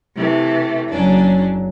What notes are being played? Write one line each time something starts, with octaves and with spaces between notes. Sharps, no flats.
C3 E3 A3
F#1 F#3 C#4 D4